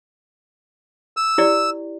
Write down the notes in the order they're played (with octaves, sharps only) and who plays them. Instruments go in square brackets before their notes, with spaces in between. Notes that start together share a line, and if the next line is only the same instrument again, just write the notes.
[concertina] E6
[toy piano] E4 G4 D5